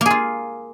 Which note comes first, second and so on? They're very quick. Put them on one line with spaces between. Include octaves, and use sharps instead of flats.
A#3 G#4 F4